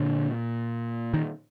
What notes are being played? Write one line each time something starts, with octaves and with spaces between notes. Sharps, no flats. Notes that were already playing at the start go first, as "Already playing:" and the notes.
Already playing: A#2 D3
D#3